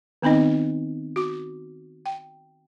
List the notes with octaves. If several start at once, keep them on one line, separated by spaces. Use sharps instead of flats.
D#3 B3 C4 D#4 D#5
F#4 D6
G5